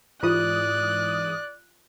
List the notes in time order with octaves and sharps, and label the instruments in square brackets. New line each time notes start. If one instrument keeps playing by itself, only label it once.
[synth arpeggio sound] G#2 E3 D#6 [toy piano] F4 G4 C5 [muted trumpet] D5 [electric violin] F#6